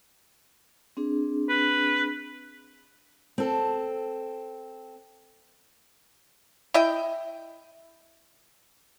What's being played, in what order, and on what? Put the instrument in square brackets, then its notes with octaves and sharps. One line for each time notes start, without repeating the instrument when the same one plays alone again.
[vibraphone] C4 D4 G#4
[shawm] B4
[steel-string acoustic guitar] C4 A4
[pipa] E4 D#5 G5